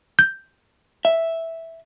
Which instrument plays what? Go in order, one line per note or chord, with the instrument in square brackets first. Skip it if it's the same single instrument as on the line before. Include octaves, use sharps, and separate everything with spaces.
[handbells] G6
[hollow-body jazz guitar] E5